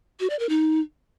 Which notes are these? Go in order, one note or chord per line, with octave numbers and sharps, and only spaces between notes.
F#4
D5
A#4
D#4